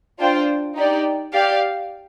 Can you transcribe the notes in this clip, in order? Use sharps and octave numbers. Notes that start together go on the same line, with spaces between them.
D4 F4 C5 G5
D#4 G4 D5
G4 D5 F5